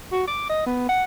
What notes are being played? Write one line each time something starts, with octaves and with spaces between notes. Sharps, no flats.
F#4
D6
D#5
B3
F#5